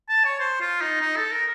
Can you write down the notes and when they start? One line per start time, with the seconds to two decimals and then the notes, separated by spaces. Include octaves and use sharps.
0.09 A5
0.25 C#5
0.40 C5
0.61 F4
0.81 D#4
1.01 D#4
1.16 A4
1.32 A#4